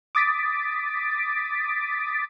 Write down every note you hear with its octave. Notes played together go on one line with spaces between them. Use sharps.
D6 D#6 A6 B6 D7